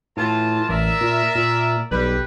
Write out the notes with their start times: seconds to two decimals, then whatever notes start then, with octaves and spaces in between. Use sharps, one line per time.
0.17 A2 E3 F4 A5
0.69 A1 A#4 D5 E5
1.01 A#2
1.35 A#2
1.91 B1 G3 B4